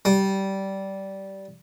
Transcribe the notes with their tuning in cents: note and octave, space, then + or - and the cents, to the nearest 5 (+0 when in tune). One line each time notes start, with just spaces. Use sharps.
G3 -15